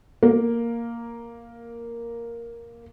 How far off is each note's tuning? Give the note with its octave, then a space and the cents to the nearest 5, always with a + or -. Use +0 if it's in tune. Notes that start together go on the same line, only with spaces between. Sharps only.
A#3 +0 A#4 +0